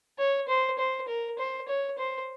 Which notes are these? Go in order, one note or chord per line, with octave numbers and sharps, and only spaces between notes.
C#5
C5
C5
A#4
C5
C#5
C5